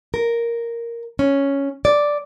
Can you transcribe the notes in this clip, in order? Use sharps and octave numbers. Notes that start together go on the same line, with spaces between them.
A#4
C#4
D5